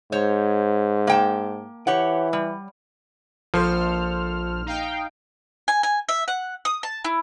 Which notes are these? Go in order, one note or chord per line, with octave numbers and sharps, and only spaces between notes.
G#2 C5 C#5
A#3 G5 A5
E3 G4 C#5 F#5
G3
A#1 F3 A4 C5 C6 F6
D#4 F5 G5
G#5
G#5
E5
F#5
D#6
A5
E4